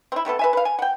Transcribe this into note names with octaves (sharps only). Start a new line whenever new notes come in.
C4 E4
C3 A3 B3 A4
B4 E5 G#5
B4 F5
G#5
F#5 G5